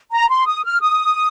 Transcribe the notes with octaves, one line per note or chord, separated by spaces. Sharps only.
A#5
C6
D#6
F6
D#6